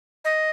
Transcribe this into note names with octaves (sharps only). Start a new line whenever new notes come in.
D#5